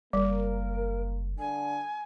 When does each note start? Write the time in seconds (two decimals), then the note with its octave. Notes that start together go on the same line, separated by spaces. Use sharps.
0.13 F#1 G3 A#3 A#4
1.39 D3 G#5